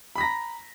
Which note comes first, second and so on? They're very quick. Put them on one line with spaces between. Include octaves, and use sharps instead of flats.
B5 B6 A#6 A#5